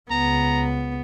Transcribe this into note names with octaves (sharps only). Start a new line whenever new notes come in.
C#2 B3 A#5